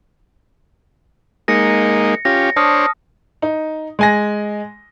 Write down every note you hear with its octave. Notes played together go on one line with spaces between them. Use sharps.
G#3 A#3 D#4 A#6 C#7
C#4 F4 G4 A#6
D4 C5 C#5 A5 D#6 F6
D#4
G#3 G#5 A#6